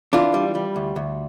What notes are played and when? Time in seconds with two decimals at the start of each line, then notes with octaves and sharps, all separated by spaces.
0.13 E3 D4 F4
0.34 G3
0.55 G3
0.76 D2
0.96 D2